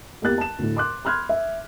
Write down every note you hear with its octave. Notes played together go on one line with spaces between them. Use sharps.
E2 A#3 G4 F#6 A6
A5 E7
D2 A2
C6 D6 F#6
B5 C6 F6 F#6 G#6
E5